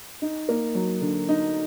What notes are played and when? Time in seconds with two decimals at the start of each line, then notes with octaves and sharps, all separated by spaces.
0.22 D#4
0.49 A#3
0.75 F#3
1.01 D3
1.29 D#4